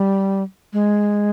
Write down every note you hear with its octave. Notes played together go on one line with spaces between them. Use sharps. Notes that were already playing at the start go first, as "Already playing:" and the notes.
Already playing: G3
G#3